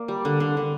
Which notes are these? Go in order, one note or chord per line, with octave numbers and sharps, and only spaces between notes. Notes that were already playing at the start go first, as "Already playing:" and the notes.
Already playing: A#3 D5
G3
D3
D3
D3